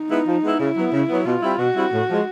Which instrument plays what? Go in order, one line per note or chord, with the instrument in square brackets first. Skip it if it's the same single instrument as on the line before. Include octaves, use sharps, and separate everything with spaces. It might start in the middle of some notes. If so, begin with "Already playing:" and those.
Already playing: [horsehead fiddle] D#4
[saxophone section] G#3 B3 E4
F3
G#3 B3 E4
[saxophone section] C#3 [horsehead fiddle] E4
[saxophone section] F#3 B3
C#3
F#3 B3
[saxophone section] B2 [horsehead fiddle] F4
[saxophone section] G3 C4 E4
[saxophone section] B2 [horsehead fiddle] F#4
[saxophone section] G3 C4 E4
A2
F3 G#3